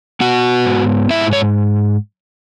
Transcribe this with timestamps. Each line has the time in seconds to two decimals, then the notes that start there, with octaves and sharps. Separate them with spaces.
0.20 B3 F#4 F#5
0.65 G#2
1.10 G#2 E4 E5
1.33 C#5